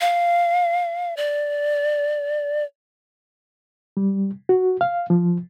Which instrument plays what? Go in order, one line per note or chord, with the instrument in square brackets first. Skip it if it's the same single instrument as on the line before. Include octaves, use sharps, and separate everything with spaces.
[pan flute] F5
D5
[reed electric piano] G3
F#4
F5
F3